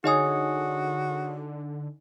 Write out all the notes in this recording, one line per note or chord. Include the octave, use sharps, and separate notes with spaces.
D3 D#4 F#4 G#4 C#5 D#5 G#5 D#6